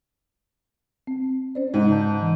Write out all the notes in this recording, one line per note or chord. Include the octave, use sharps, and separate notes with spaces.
C4
C#4 C5 D5
G#2 G#3
C#3 A5 G6
E3